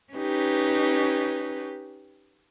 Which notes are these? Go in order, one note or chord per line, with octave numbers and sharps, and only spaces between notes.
C#4 D#4 G4 B4